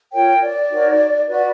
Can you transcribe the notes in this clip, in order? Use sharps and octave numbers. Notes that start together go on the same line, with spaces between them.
F4 A#4 C#5 G5
D5
D#4 F#4 A#4 C#5
F#4 B4 D5